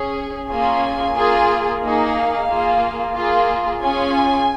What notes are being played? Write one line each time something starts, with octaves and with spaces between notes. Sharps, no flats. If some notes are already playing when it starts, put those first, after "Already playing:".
Already playing: C#4 G#4
A#3 C#4 F4 G#4 G#5
A#3 F4 G#4
A#3 D#4 G#4 F5
A#3 F4 G#4
A#3 F4 G#4
C#4 F4 G#4 G#5